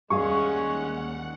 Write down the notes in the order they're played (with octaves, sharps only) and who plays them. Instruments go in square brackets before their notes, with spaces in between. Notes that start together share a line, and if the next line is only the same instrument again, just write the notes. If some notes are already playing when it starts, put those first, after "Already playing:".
[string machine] D#2 F#5 [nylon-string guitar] G3 G#4 F5 [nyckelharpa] G#3 C#4 [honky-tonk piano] C#6